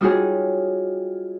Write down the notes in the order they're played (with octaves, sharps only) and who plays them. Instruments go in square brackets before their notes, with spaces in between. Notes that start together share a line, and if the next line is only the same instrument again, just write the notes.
[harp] G3 D#4 F4 F#4 G#4 C#5